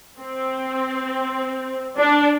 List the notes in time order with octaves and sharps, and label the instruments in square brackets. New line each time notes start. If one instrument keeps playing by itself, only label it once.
[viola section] C4
D4